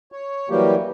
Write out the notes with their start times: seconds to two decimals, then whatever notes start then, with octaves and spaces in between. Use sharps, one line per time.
0.12 C#5
0.50 E3 F#3 G3 A#3 G4